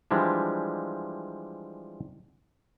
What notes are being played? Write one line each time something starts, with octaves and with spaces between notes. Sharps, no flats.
E3 F3 G3 G#3 D4